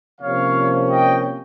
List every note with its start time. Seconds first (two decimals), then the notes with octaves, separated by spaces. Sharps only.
0.21 C3 F3 A#3 C#4 C#5 F5
0.89 D#5 G5